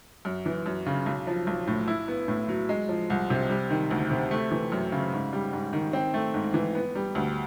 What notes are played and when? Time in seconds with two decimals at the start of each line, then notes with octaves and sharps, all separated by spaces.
0.25 F#2
0.46 E3
0.66 F#2
0.86 C#3
1.06 B1
1.27 F3
1.47 B1
1.67 A2
1.88 E4
2.08 B3
2.28 A2
2.48 F#3
2.69 G#3
2.89 F3
3.10 C2
3.30 C3
3.50 G3
3.70 D#3
3.91 D2
4.11 C3
4.31 A3
4.51 E3
4.72 F#2
4.92 C#3
5.13 G#2
5.33 G3
5.53 G#2
5.73 D#3
5.93 C4
6.14 A3
6.34 G#2
6.54 E3
6.75 B3
6.95 G3
7.15 D2